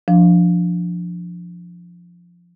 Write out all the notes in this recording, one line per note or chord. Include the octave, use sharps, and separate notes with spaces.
F3 D4